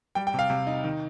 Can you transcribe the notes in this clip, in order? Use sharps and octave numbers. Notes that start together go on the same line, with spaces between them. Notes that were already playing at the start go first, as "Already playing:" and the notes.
G3 G5
G5
C3 F5
C3
D#4
D#3